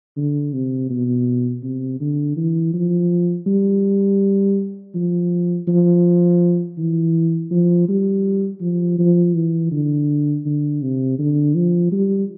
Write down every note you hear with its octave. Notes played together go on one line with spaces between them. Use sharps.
D3
C3
B2
C3
D3
E3
F3
G3
F3
F3
E3
F3
G3
F3
F3
E3
D3
D3
C3
D3
F3
G3